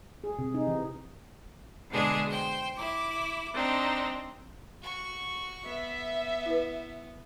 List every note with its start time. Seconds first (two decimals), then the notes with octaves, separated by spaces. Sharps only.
0.24 G#4
0.39 C3
0.54 D#4
0.68 E3
1.91 B2 D3 G#3 D4 G#4
2.31 C5 G5
2.77 E4 D6
3.54 C4 D4 D#4
4.82 F#4 C#6
5.66 B3 E5
6.46 E4 B4